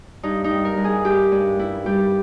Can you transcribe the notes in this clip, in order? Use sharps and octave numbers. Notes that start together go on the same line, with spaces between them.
G2 D#4
D#4
G3
A#4
G2
G#4
G3 G4
G2
G3 E4
G3 G4